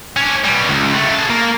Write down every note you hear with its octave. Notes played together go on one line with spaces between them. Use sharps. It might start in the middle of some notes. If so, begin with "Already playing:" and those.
C#4 D4
B2 G3
C#2
F#3 A3
G#4 A5
A#3